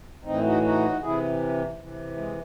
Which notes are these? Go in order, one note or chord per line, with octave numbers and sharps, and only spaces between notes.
A2 E3 C4 D#4
D#4 F#4
D#4 F#4
C3 E3 E4 G#4
C3 E3
G#3